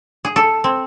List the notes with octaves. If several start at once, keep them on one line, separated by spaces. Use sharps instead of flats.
G#4
A4
C4